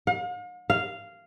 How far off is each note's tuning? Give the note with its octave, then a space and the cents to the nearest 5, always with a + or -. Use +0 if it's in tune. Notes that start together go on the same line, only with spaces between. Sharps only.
F5 +45
F5 -10